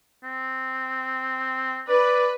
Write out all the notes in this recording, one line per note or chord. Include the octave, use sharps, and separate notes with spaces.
C4
B4 D5